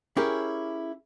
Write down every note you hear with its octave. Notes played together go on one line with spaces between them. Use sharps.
C#4 E4 G4 G#4 A#4